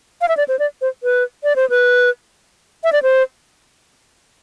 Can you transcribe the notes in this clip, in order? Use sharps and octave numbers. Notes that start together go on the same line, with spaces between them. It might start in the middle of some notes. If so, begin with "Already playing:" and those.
F5
E5
D5
C5
D5
C5
B4
D5
C5
B4
E5
D5
C5